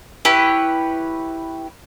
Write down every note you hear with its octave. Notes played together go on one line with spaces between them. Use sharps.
E4 G4 B4 C#5